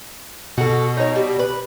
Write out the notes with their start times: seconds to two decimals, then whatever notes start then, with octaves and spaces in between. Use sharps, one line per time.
0.58 B2 F#4 A4
0.97 D#4 C#5
1.16 G3
1.39 B4